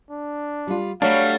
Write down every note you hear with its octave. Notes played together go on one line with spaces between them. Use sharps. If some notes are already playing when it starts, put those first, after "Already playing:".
D4
G3 F4
F#3 G3 A3 D4 F#4 F5